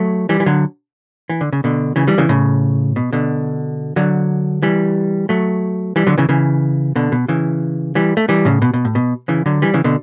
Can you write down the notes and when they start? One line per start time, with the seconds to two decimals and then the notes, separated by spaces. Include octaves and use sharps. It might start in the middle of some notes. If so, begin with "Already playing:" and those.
Already playing: F#3 A3
0.29 E3 G3
0.40 E3
0.46 D3 F#3
1.29 E3
1.41 D3
1.53 C#3
1.64 B2 D3
1.96 C#3 E3
2.07 E3 G3
2.18 C#3 E3
2.29 A2 C#3
2.96 B2
3.13 B2 D3
3.96 D3 F#3
4.62 E3 G3
5.29 F#3 A3
5.96 E3 G3
6.07 D3 F#3
6.18 C#3 E3
6.29 C#3 E3
6.96 B2 D3
7.12 B2
7.28 C#3 E3
7.95 E3 G3
8.17 A3
8.29 E3 G3
8.45 A2 C#3
8.62 B2
8.74 B2
8.85 A2
8.95 B2
9.28 C#3 E3
9.46 D3 F#3
9.62 E3 G3
9.74 C#3 E3
9.84 B2 D3